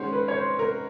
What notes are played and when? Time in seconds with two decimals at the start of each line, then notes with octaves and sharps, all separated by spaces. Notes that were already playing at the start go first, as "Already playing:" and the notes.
Already playing: D#3 G#3 C#4 F#4 A#4 C5 C#5
0.13 B4
0.28 C#5
0.36 C5
0.59 A#4